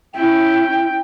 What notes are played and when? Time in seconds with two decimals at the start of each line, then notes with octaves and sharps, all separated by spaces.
0.14 C#4 E4 G5